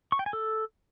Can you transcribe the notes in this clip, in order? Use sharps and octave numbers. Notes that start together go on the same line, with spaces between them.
C#6
G5
G#5
A4